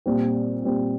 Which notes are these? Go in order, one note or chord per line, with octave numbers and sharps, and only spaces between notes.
A#2 G3 C4
A#2 G3 C4